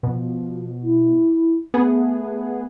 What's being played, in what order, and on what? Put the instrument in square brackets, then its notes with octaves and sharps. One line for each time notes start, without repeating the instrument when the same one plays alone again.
[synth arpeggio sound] B2 [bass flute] F3
[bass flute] E4
[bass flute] A3 [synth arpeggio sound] B3 G#4